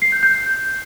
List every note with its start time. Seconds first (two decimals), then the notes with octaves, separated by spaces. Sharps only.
0.02 C7
0.12 G6
0.23 G6